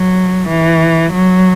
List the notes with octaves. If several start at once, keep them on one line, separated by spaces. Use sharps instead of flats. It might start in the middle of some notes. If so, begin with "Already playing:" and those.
Already playing: F#3
E3
F#3